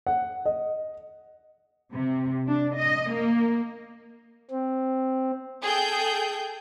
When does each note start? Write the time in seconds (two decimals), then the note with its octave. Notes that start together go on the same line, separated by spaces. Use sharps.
0.07 F#5
0.46 D#5
1.92 C3
2.47 D4
2.76 D#5
3.12 A#3
4.51 C4
5.64 G#4 A4 G5 G6